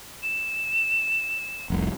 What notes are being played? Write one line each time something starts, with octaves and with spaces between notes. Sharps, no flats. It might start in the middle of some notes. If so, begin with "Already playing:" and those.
E7
F1 C2